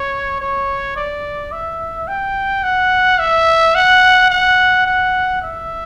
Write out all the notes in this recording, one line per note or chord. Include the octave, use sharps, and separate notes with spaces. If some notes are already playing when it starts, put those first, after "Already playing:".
Already playing: C#5
C#5
D5
E5
G5
F#5
E5
F#5
F#5
F#5
E5